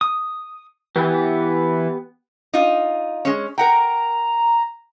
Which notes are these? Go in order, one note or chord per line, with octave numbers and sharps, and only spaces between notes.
D#6
E3 B3 G4
D#4 F4
G#3 C#4
A#4 F#5 G5 A#5